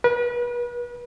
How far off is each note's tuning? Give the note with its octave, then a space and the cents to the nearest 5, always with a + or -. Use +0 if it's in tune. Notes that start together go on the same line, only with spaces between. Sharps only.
B4 -35